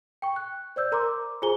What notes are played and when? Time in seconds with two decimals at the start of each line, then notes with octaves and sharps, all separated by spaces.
0.22 G5 C#6
0.36 F#6
0.76 C5 D5 E6 G6
0.92 A#4 A#5 C6 D6
1.42 F4 G#4 C5 G#5 A#5 G7